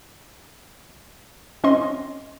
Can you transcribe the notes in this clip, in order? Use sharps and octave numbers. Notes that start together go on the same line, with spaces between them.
C4 C#4 D#5 C6